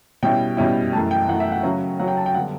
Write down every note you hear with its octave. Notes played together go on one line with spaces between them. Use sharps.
B2 G3 C#4 E4 G5
B2 G3 C#4 E4
F#2 E3 A3 A5
G5
F#2 E3 A3 F#5
E5
F#5
C#3 F#3 C#4
C#3 F#3 C#4 F#5
G5
A5
G5
D3 G3 B3 F#5